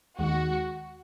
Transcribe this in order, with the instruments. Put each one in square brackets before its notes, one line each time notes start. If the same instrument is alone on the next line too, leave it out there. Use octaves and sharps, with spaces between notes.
[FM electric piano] D#2 D#3 G#3 [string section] F#4